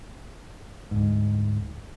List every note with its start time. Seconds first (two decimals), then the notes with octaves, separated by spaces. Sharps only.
0.91 D2 G#2